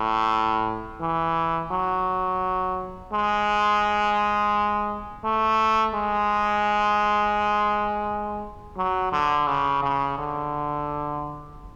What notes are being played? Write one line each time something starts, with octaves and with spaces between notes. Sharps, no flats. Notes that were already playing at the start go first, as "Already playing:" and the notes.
Already playing: A2
E3
F#3
G#3
A3
G#3
F#3
D3
C#3
C#3
D3